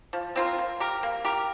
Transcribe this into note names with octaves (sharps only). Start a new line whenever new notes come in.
F3
C4 F4 A#4
A#3
G4 A#4
A#3
G4 A#4